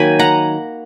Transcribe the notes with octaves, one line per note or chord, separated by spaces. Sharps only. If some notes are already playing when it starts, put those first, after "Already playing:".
Already playing: D#3 F#3 A#3 G#5 B5
F#5 A#5